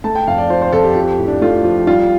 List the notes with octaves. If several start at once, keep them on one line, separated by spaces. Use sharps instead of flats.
A3 A5
G5
F2 F5
D5
F3 C5
C5
F2 A4
G4
F3
A2
D4
A3 F4
F3
G3 F4